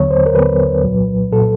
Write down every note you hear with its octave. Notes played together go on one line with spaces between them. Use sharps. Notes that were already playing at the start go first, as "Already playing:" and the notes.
Already playing: D#2 D3 F#3 B3 C#5
C5
A#4
D#2 D3 F#3 B3 B4
C2 A#2 F#3
A#2 F#3 A4